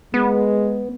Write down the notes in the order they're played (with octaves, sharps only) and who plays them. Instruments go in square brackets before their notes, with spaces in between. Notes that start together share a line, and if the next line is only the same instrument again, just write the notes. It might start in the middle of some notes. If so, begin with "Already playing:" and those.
[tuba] G#3 [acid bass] B3